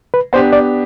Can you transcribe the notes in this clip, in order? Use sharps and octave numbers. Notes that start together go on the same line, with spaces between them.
B4
B3 D4 G4 C5
D5